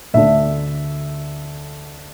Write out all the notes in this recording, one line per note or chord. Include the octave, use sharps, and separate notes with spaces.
D2 D3 A3 D4 E5